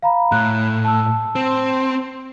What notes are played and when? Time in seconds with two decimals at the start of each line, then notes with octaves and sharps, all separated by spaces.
0.03 F5 A#5 B5
0.32 A2 F#6
0.85 A5 E6
1.35 C4